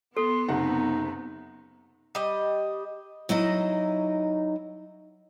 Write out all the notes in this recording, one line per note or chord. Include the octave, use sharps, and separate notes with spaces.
B3 A4 C6
F#1 C3 D#4 F#5
G3 D#5
F#3 D#4 E4 D#5